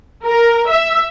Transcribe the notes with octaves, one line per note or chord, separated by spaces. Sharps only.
A#4
E5